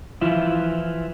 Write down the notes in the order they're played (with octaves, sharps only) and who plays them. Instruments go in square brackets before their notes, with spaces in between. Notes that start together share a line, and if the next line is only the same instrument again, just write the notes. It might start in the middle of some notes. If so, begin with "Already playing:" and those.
[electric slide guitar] E3 F3 E4 F4